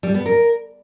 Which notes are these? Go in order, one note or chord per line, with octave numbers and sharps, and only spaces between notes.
G3
B3
A#4